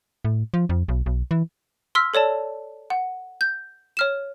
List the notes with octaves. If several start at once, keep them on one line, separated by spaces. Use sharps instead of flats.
A2
F3
F2
B1
B1
E3
C6 E6 F6 B6
A4 C#5 D5 A5
F#5
G6
C#5 F6 E7